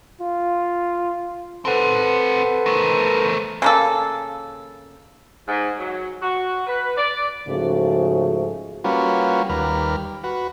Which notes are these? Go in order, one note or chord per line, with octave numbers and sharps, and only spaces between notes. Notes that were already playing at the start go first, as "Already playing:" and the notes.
F4
C4 A4 B4 C5 F#5
A3 A#4
C#3 A#3 A4
G#2
F#3
F#4
B4
D5
G#2 C#3 F3 A3 F#4
G3 A#3 C#4 F4 F#4 B4
D#2 G3 A#4 B4 F6
F#4 B4